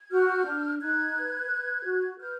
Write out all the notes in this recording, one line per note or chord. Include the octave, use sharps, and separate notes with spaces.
G#6
F#4 F6 G6
D4
D#4 F#6 G#6
B4
B4
F#4
B4 F6 G6